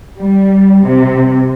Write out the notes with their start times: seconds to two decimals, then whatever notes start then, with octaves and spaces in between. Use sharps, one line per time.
0.20 G3
0.86 C3